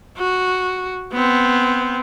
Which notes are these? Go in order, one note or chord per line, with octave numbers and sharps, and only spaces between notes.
F#4
B3 C4